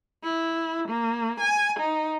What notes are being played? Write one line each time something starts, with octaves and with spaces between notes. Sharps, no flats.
E4
A#3
G#5
D#4